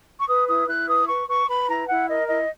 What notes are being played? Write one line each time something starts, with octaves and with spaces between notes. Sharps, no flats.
C#6
B4 D#6
E4 D#6
E4 F#6
B4 D#6
B4 C#6
B4 C#6
B4 B5
E4 A#5
E4 F#5
A#4 D#5
E4 D#5